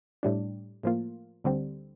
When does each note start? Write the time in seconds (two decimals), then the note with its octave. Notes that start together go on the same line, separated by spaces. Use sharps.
0.23 A2 G3 D4
0.83 A2 F3 A#3 F4
1.44 D2 D3 G3 C4